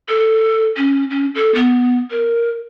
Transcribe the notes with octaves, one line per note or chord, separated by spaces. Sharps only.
A4
C#4
C#4
A4
B3
A#4